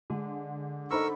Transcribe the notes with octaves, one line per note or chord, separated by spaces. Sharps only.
D3 G#3
D#4 A4 A#4 C5 B5 C#6 E6